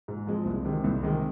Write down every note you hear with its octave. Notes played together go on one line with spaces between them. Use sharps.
G#2
F3 G#3 C4
C2
C3 D#3 G#3
C2
C3 D#3 G#3